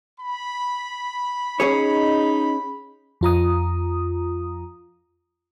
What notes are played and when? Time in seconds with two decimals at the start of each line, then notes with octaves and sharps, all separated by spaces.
0.21 B5
1.60 C#4 D#4 G#4 C#5
3.21 F2 F4 A#5 D#6